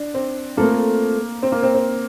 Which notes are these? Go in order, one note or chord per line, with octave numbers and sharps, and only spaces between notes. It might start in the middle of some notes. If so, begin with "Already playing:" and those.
Already playing: D4
C4
A3 A#3 C4 F4 A4
C4
A#3
C4
C4